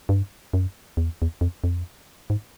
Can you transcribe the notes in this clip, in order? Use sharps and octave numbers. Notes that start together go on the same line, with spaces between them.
G2
F#2
E2
E2
F2
F2
G#2